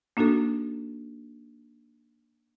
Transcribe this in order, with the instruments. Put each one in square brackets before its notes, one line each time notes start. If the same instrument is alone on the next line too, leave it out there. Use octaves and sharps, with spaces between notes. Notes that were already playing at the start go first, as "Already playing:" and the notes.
[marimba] A#3 D4 D#4 F#4 A4